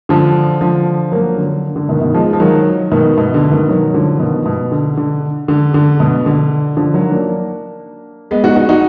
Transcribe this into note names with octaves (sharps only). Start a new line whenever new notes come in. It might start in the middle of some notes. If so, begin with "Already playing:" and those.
D3 F3
D3 F3
F#3 A#3
D3
D3
B2 D#3
B2 D#3
F3 G#3
F3
D#3 F#3
B2 D#3
B2
D3
B2 D#3
D#3 F#3
D3 F3
B2 D#3
B2
D3
D3
D3
D3
B2
D3
D3 F3
D#3 F#3
A#3 D4
G#3 B3
D#4 F#4
D#4 F#4
D#4 F#4